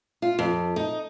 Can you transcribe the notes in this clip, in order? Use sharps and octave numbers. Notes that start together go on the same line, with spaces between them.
F4
F2
D#4